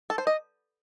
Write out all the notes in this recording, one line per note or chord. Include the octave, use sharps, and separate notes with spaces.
A4
C5
D#5